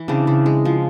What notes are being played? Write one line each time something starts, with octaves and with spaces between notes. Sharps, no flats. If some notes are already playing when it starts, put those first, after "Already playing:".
Already playing: E3 E4
C#3 C4 D4
C#3
G#3
F3